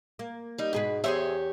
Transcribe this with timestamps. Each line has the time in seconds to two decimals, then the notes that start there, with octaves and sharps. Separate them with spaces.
0.19 A#3
0.58 G3 D#4
0.73 G#2 B2 G#4 B4
1.04 E2 G4 G#4 C5 C#5 E5